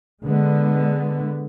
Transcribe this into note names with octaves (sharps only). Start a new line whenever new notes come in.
D3 G#3 B3